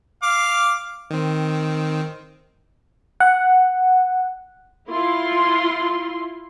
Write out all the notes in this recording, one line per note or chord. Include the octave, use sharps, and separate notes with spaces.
F5 D6
D#3 C4
F#5
E4 F4 C6